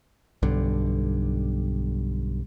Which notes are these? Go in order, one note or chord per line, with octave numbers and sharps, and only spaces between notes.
B1 G2 D3